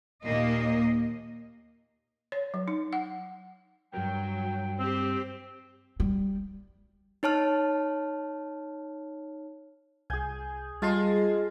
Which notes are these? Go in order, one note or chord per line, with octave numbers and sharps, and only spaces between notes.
D#2 A#2 A#3 D#5
C#5
F#3
D#4
F#5
G2 F#3 A#4 G5
C4 G4 C5
G3
D#4 C#5 A5 F6
C2 G#4 G#5 G6
G3 G#3 F4 A5 C6